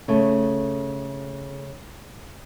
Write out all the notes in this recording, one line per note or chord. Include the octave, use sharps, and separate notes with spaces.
C#3 A3